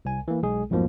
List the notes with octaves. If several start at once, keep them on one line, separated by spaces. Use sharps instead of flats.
C2 G#5
E3 A#3
B1 G#3 G#4
B1 F2 G#2 B2 F3 A#3